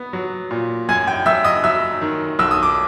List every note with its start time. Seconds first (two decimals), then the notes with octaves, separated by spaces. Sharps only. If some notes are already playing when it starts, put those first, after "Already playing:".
Already playing: B3
0.13 F#3
0.51 A#2
0.89 F#2 G#5 G#6
1.08 G5 G6
1.26 F#2 E5 E6
1.45 D#5 D#6
1.64 F#3 E5 E6
2.01 D#3
2.39 B1 E6
2.51 D#6
2.63 D6